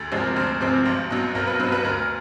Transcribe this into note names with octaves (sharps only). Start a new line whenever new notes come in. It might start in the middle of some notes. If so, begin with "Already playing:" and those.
Already playing: D2 A4
C3 F3 G#3 C4
A#4
D2 C5
C3 F3 G#3 C4
B1
B2 F#3
B1 A#4
B4
B2 F#3 C5
B4
D2 A#4